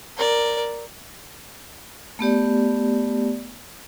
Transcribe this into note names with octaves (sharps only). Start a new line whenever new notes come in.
A#4 D5
A3 B3 G4 D5